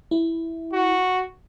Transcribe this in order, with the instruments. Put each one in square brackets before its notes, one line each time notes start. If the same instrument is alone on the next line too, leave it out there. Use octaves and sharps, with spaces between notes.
[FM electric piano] E4
[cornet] F#4